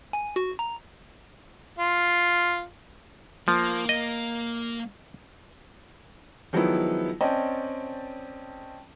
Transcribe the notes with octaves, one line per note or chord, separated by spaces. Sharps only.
G#5
F#4
A#5
F4
F3 A#3
D#5
D#3 F3 F#3 G#3 B3 E4
C4 C#4 D5 D#5 G5 A5